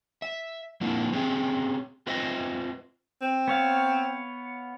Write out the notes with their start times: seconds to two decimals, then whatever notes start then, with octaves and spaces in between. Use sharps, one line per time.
0.22 E5
0.81 F3 A#3 C4 D4 E4
1.13 C4 C#4 G4 G#4
2.07 C4 F4 B4 C5 D#5 E5
3.22 C4
3.48 B3 C#5 F5